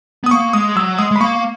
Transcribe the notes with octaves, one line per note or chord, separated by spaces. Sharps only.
B3 D#6
A#3 C#6
G#3 D#6
F#3 E6
G#3 D#6
G#3
B5
A#3 C#6